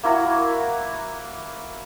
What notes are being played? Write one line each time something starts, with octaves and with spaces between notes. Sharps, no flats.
A#3 E4 F#4 A#5